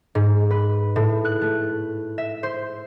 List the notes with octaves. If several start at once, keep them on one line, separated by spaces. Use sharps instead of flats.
G#2
B4
A2
F#6
A3
E5
C5